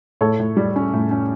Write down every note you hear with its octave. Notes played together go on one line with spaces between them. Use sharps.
A2 A4 C#5
A2
G3
C#4
A2
C#4